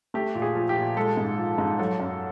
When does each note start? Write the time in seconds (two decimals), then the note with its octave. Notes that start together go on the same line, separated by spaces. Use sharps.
0.14 A3 G4
0.35 A#2
0.42 G#4
0.55 F3
0.69 G4
0.76 A#2
0.97 G#3 A4
1.17 G#2
1.37 F3
1.58 G#2
1.79 F#3 A4
2.00 F#2